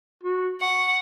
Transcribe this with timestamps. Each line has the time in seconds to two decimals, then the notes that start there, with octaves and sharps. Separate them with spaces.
0.24 F#4
0.61 F#5 C#6